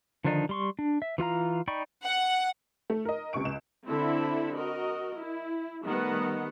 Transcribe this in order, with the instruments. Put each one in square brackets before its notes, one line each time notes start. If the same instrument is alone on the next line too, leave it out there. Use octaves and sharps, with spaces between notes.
[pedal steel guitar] D3 D#3 F3 D4 D#4
G3 C6 C#6
D4
E5
E3 F4 F5 A#5
D#4 D5 G5 B5 C#6
[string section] F#5
[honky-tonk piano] A3
A#4 D#5
C#2 C3 C#6 D7
C#2 E7
[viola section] D3 C4 E4 A4 E5 B5
F#4 A#4 D#5
E4
D#3 G3 A3 B3 D#5 F#5